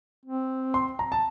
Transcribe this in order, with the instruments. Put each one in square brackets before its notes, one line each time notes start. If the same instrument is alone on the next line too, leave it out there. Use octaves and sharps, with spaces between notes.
[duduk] C4
[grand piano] C6
A#5
A5